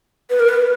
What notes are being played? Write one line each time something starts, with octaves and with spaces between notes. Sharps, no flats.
B4
A#4
B4